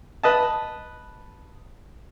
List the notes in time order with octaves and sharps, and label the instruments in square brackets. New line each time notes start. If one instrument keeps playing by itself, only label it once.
[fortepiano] B4 D#5 A5